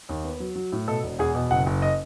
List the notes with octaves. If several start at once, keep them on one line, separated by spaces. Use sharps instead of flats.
D#2
B3
F#3
F#3
A2
B2 A4
E1
E2 G#4
B2
F#1 F#5
F#1
D#5